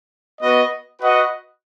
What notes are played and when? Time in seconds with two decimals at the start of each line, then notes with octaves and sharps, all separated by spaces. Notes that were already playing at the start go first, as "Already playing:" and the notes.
0.41 B3 F#4 B4 D#5
1.00 F#4 B4 D#5 F#5